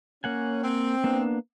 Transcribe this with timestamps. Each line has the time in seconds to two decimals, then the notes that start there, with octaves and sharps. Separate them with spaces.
0.24 A#3 C#4 F#5 G#5
0.64 C4
1.04 A#3 B3 D4